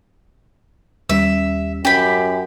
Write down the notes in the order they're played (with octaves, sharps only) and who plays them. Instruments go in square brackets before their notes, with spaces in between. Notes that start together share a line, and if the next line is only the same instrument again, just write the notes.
[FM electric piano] D#2 G3 C#4 [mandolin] E5
[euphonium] F#2 [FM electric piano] C#4 [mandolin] G4 B5